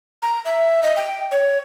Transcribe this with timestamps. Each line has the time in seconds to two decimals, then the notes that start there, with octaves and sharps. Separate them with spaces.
0.22 A#5
0.45 E5
0.83 D#5
0.96 G5
1.31 C#5